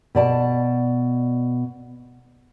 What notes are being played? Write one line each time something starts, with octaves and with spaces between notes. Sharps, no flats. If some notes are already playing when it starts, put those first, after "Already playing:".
B2 D5 A5